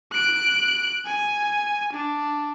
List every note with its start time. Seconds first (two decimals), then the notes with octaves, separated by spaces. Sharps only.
0.12 F#6 D7
1.06 G#5
1.92 D4